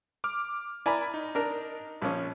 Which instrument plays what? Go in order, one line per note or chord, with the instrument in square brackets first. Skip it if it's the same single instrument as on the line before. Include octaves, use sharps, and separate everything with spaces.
[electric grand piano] D6 F6
[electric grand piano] E4 B5 [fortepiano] D5 G#5 A#5
[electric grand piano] D#4
[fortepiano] D4 A#4
A#1 F3 C#4